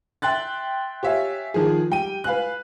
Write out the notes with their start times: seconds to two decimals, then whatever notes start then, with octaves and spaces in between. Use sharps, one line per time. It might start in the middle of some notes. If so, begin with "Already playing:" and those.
0.22 E5 G5 C6 F#6 A6
1.03 G4 C#5 E5 F5 G#5
1.54 D#3 F3 G#4
1.90 G3 G5 D#7
2.24 B4 F5 G#5 F#6